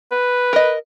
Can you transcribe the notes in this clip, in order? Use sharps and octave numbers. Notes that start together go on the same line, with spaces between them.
B4
A#4 D#5